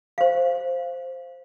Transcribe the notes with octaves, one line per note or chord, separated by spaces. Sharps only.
C5 F5